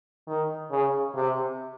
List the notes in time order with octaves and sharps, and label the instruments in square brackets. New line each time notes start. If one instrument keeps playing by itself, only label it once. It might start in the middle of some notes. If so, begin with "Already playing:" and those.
[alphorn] D#3
C#3
C3